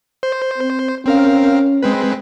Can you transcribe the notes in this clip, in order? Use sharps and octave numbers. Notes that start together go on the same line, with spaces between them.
C5
C4
C4 C#4 A#4 F5
G#3 C4 B4